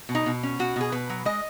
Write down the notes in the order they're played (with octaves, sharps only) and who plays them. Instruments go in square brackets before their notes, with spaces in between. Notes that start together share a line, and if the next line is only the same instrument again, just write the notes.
[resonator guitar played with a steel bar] B2
D#4
B2
C#4
B2 F#4
B2 G#4
B2 B4
F#3
G#3 D#5